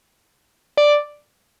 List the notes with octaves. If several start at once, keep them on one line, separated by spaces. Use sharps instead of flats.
D5